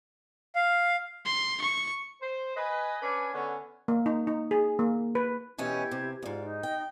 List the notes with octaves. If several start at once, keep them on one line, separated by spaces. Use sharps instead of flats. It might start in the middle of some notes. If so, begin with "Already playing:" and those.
F5
C6
C#6
C5
B4 D#5 G#5
C#4 D4 B4 G#5
D3 B3 C#4
A#3
D#4
D#4
G#4
A#3
B4
B2 E3 C#4 E4 G4 G#6
C3
F2 G#2 F4 D5
D#4
G5